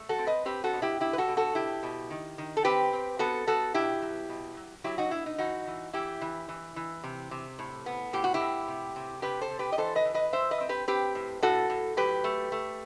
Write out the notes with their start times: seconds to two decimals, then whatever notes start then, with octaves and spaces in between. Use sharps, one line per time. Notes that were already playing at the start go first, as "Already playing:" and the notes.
Already playing: A3
0.09 F#4 A4
0.18 C4
0.27 B4 D#5
0.45 C4 G4 B4
0.64 F#4 A4
0.73 B2
0.82 E4 G4
1.00 B2 E4 G4
1.13 B4
1.18 F#4 A4
1.28 B2
1.37 F#4 A4
1.55 B2 E4 G4
1.83 B2
2.10 D#3
2.38 D#3
2.57 A4
2.64 C4 G4 B4
2.93 C4
3.19 B3 F#4 A4
3.47 B3 F#4 A4
3.74 B2 E4 G4
4.02 F#3
4.29 B2
4.57 F#3
4.84 F#3 E4 G4
4.98 D#4 F#4
5.11 B2 E4
5.26 D#4
5.38 E3 D#4 F#4
5.67 E3
5.93 E3 E4 G4
6.22 E3
6.49 E3
6.76 E3
7.04 C3
7.31 C3
7.59 A2
7.86 B3
8.13 A2 G4
8.24 F#4
8.34 E4 G4
8.40 A2
8.68 C3
8.96 C3
9.22 C3 G4 B4
9.41 A4 C5
9.50 C3
9.59 G4 B4
9.72 D#5
9.78 E3 A4 C5
9.95 B4 D#5
10.05 E3
10.14 B4 D#5
10.33 E3 C5 E5
10.51 B4 D#5
10.60 C4
10.69 G4 B4
10.88 C4 G4 B4
11.15 A2
11.42 A2 F#4 A4
11.70 A2
11.97 F#3 G4 B4
12.24 A3
12.52 A3